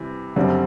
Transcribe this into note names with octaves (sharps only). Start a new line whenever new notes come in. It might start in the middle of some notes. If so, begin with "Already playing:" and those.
Already playing: C3 E3 G3
F#1 F#2 D3 G3 C4